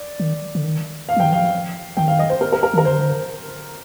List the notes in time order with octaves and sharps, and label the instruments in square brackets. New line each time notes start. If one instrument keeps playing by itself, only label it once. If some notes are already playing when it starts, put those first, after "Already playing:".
Already playing: [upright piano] D5
[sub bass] D#3
D3
D#3
[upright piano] F5
[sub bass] F3
[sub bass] D#3 [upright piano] G5
[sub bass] F3 [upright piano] F5
[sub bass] D#3 [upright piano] G5
[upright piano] F5
D#5
C5
A#4
A#4
A#4
[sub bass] D#3 [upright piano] A#4
[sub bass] D3 [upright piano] C5